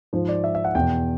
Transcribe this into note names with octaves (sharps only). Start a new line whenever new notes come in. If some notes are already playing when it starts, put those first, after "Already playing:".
G#2 F3 C5
D5
E5
E5
F#5
E2 B2 G5